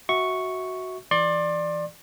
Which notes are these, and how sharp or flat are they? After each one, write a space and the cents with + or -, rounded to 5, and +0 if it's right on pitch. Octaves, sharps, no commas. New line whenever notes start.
F#4 +0 E5 -25 C#6 +0
E3 +15 D5 +15 C6 +35